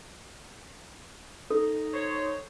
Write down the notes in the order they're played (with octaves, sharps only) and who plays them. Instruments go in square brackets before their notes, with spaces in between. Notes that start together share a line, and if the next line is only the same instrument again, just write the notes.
[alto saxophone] D#4 [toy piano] A4
[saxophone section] C5 C#5